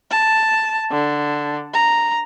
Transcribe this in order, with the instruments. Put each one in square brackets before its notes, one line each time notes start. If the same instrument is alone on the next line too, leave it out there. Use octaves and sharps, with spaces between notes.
[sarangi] A5
D3
A#5